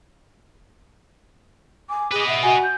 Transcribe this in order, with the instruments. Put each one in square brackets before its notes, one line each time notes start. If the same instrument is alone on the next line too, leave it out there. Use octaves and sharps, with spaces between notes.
[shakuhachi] G#5 [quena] D6
[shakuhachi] G#4 [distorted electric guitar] B4 D#5
[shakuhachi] E5 [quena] F#5
[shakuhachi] F#4 [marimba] G#5
[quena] G6